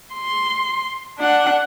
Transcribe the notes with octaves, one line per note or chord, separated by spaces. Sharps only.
C6
D4 F#5